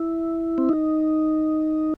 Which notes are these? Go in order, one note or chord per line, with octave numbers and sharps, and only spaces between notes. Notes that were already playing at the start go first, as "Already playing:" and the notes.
Already playing: E4
C4
D#4